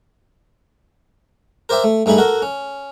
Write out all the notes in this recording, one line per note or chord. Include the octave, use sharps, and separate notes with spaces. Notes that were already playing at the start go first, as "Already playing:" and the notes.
A#4 C5 D5 E5 G5
A3
G2 A3 D#4 G#4 B5
F#4 A4 A#4
C#4